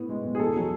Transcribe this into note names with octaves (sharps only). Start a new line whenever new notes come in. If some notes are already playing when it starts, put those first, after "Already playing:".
Already playing: A2 B3
G#3
B1
G#4
E2 A4
F#3